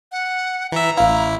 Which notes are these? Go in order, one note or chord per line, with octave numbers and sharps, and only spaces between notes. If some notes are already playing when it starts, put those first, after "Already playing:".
F#5
E3 E5 A#5
A1 E4 F5